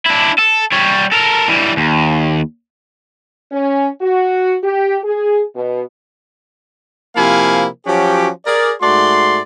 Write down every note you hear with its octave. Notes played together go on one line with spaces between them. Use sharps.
D4 E4
A4
G3 C#5
A4 A#4
E3 G3
D#2
C#4
F#4
G4
G#4
B2
C3 F3 A#3 E4 F5 G#5
F3 F#3 C#4 F#4 G4
G#4 A#4 D5
G#2 A3 F#4 D5 C6